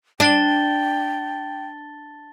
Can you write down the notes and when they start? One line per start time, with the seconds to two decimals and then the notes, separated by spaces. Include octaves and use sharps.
0.20 D4 G5 A5 A6 G7